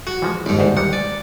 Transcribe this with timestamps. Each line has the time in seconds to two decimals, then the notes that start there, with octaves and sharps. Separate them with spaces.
0.07 F#4
0.22 E3 F3 G#3
0.46 D#2 G#2
0.59 D2 B4 C5
0.77 D#3 G3 F#5
0.93 D5 G#5